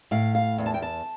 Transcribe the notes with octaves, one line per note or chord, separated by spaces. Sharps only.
A2 F5
F5
E2
A5
G5
A5